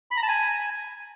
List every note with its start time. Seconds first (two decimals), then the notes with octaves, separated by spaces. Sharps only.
0.11 B5
0.17 A#5
0.23 A5
0.28 G#5